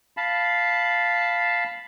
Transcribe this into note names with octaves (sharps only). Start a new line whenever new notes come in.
F5 A5 B5